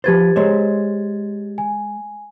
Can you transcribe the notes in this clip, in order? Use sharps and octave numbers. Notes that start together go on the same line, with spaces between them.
F3 G4 B4 C5 G#6 A6
G#3 C5 C#5
G#5